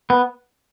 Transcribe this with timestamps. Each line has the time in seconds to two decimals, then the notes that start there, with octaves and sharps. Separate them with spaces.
0.10 B3